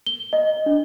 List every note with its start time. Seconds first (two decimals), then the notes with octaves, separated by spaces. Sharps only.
0.07 G7
0.33 D#5
0.66 D4